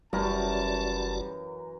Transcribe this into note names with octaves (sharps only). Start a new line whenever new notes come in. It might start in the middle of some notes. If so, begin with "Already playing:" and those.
F#1 F#2 E3 G3 F#4 A#4 D5 A5